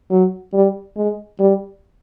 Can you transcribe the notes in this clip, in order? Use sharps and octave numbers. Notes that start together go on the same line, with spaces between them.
F#3
G3
G#3
G3